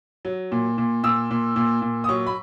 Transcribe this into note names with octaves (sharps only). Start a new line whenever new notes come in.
F#3
A#2
A#2
A#2 E6
A#2
A#2
A#2
D#6
F#3 C#6
B5